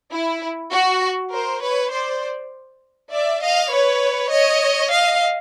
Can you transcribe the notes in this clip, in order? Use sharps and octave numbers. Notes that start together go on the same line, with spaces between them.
E4
F#4
A#4 C5
B4 C#5
C5 D5
D5 E5
D#5 F5
B4 C#5
C#5 D#5
D#5 F5